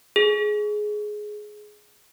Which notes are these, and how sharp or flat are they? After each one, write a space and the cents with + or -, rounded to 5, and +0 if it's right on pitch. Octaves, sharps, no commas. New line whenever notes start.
G#4 +15